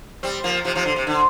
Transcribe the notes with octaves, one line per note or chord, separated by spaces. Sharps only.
G3 C4
F3 A#3
C3 F3
C3 F3
D3
C3
D3